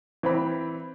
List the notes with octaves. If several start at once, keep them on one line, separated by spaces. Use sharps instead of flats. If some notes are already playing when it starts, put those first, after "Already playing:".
E3 C4 B5